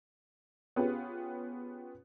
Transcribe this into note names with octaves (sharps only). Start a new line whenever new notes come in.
B3 C#4 F4 G4 G#4 B4